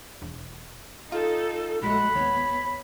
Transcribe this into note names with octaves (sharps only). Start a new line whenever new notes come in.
E1
D#4 F4 A4
A#1 F#3 G#3 A3 F#5 B5
D#2 B3 C#5